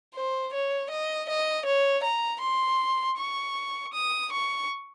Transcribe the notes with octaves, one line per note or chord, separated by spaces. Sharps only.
C5
C#5
D#5
D#5
C#5
A#5
C6
C#6
D#6
C#6